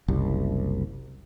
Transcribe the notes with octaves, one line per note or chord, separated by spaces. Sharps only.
F#1 C2